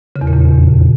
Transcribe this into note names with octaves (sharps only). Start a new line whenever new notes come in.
C#3
E2
A#2
F2